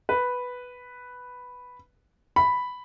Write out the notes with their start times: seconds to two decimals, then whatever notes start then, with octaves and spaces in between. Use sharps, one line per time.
0.09 B4
2.36 B5